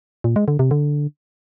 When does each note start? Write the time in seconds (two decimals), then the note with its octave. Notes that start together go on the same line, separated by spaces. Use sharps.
0.24 A#2
0.36 G#3
0.48 D3
0.59 C3
0.71 D3